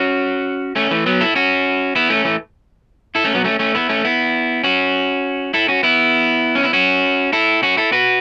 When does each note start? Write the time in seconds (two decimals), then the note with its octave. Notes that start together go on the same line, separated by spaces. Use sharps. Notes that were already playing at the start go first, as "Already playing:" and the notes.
Already playing: C#4 F#4
0.76 A3 C#4
0.91 E3 A3
1.06 F#3 B3
1.21 E4 A4
1.36 C#4 F#4
1.95 B3 E4
2.10 A3 C#4
2.24 E3 A3
3.15 E4 A4
3.24 A3 C#4
3.34 F#3 B3
3.44 A3 C#4
3.59 A3 C#4
3.75 B3 E4
3.89 A3 C#4
4.05 B3 E4
4.64 C#4 F#4
5.54 E4 A4
5.68 C#4 F#4
5.83 B3 E4
6.55 C#4
6.64 E4
6.73 C#4 F#4
7.33 E4 A4
7.63 C#4 F#4
7.77 E4 A4
7.92 F#4 B4